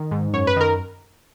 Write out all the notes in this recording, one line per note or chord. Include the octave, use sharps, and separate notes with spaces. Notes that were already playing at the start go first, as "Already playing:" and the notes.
Already playing: D#3
G#2
F#2 C#5
B4
D#3 A#4